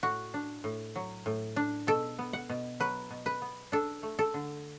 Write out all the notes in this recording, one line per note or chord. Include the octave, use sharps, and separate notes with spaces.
A2 F#4
D4
A2
F#3
A2
D4
B2 A4
B3
F#5
B2
F#3 B4
B2
B4
B3
D4 A4
A3
A4
D3